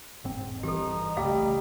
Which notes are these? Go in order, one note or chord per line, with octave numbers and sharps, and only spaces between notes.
E1 G#2 C4
G#1 G2 E3 D#4 G4 A4
C2 C#3 G3 A3 F5